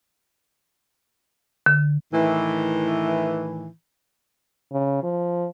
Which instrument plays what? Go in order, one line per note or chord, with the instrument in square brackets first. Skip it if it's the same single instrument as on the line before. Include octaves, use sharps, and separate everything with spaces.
[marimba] D3
[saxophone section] A2 D#3 E3
[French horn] C#3
F3